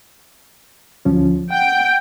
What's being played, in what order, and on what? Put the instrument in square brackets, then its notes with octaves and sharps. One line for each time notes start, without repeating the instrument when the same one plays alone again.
[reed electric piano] D2 F3 C#4
[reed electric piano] F#5 [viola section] G5